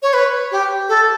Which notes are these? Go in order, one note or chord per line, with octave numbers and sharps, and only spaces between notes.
C#5
B4
G4
A4